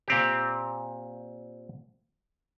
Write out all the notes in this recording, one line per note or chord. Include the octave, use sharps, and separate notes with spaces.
A#2 C4 G4